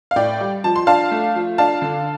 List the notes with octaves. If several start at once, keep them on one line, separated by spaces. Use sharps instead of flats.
F5
A2 D5 G5
G3
F3 A5
C6
D4 F5 A5
A3
F3
D4 F5 A5
D3